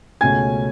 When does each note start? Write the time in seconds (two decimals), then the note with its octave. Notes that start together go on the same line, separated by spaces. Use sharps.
0.21 C#2 B2 A3 C#4 G#5 G#6